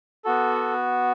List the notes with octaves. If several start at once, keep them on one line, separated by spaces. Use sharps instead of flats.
B3 F#4 A4